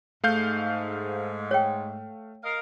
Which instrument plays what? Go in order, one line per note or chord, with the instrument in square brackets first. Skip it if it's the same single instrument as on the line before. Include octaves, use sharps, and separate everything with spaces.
[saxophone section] G#2 [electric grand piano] A3 F5 G6
[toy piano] C#5 G5
[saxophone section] A#4 D#5 F5